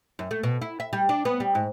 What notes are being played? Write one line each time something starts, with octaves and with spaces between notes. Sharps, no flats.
F#2
A3
B2
E4
E5
G3
D4
B3
G3
G#2